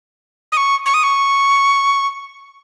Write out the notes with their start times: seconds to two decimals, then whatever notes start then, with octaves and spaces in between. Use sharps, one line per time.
0.52 D#6
0.57 C#6
0.86 C#6
0.94 D#6
1.03 C#6